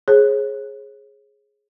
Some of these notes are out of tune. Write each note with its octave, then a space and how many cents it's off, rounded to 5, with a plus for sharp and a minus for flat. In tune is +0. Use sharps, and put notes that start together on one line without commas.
G#4 +10 C#5 -40